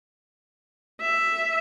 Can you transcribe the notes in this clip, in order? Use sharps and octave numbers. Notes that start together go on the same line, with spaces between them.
E5